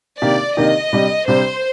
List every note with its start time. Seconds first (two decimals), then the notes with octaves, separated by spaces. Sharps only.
0.22 C3 D#3 A#3 D4 G4 D5
0.57 C3 D#3 A#3 D4 G4 D#5
0.93 C3 G3 D4 G4
1.28 C3 G3 D4 G4 C5